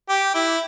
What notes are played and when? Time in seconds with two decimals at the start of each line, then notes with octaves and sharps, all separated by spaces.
0.09 G4
0.35 E4